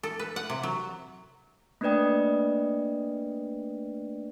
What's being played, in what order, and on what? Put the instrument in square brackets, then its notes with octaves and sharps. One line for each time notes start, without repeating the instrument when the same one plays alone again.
[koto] A4
B4
F#5
C3
F#3
[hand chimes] A3 A#3 D4 B4 D5 G5